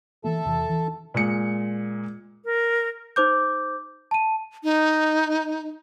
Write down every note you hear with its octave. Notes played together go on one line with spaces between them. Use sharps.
E3 A#3 A4 E5 A5
E2 C3 E3
E3
A#2 G#3 C#7
A#4
D#4 C5 D6 G6
A5 D#7
D#4